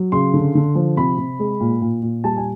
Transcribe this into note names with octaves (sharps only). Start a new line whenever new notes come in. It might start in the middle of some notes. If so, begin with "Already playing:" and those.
Already playing: F#3
C#3 C6
D3
D3
F3
C3 B5
C3
G#3
A#2
A#2
A#2
G3 A5
G#5